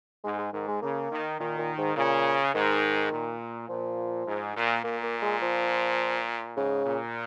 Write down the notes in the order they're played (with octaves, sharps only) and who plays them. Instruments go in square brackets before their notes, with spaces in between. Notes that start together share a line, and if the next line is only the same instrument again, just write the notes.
[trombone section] G#2 [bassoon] G#3
[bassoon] G#3
[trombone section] G#2 [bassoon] D#3
[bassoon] G#3
[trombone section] C#3 [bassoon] A#3
[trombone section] D#3
[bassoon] A#2 [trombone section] D#3
[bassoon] A#2
G#2
[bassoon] A#2 [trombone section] C#3
[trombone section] G#2 [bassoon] D#3
[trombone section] A#2
[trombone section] A#2 [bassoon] F3
[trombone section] G#2
A#2
[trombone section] A#2 [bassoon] A#3
[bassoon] A#3
G#3
F3
[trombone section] G#2 [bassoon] C#3
[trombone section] A#2